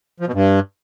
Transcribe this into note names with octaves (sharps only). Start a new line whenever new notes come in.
F3
B2
G2